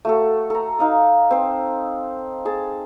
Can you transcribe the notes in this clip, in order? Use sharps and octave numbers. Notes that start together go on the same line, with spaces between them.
A3 F#4 A4
A4 A#5
D#4 F5 D#6
C4 C5
G#4 A5